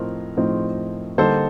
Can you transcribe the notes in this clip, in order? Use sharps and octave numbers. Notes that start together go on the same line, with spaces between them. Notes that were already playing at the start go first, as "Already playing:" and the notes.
Already playing: A2 F3 A3 C4 D#4 A#4
A2 F3 A3 C4 D#4
D3 G3 A#3 D#4 A4 C5